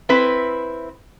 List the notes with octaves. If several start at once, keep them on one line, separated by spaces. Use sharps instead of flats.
C4 E4 B4